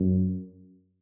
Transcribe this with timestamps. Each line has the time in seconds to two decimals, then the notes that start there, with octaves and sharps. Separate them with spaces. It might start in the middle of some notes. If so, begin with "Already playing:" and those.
Already playing: F#2